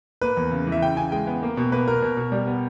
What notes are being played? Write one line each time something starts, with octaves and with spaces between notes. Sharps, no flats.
A#3 B4
E2
C#3
E3
E5
C#3 G5
C#3 G#5
G#3 G5
B3
A#3
B2
A#3 B4
B2 A#4
B2
B2
G3
B3